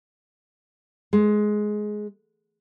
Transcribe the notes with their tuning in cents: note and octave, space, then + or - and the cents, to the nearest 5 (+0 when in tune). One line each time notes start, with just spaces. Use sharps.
G#3 +15